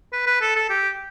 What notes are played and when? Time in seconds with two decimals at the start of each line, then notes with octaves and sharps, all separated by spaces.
0.13 B4
0.27 B4
0.41 A4
0.56 A4
0.70 G4